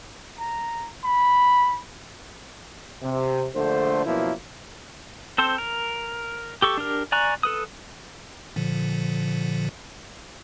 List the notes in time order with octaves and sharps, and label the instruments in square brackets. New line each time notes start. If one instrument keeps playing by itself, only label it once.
[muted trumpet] A#5
B5
[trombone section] C3
A#1 D3 A3 C5
F#2 B2 F3 A#3 E4
[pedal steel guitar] C4 A4 C5
A#4
G4 A4 C#6
D4 G4 A#4
D5 G#5 A#5 C#6 F#6
A4 B4 D#6
[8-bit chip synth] A#2 D3 F3